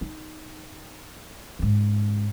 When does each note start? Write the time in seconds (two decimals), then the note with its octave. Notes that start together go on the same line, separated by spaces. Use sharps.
0.01 D#4
1.59 G#2 C#3